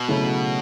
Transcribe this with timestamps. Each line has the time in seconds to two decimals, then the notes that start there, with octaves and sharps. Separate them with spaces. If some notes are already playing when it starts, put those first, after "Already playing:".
Already playing: B2
0.08 C#3 F#3 A3 E4 A4